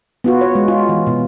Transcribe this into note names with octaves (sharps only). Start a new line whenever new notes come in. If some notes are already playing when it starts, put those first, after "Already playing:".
B3 F4 F#4
C#5
G#3
F4
E3
B2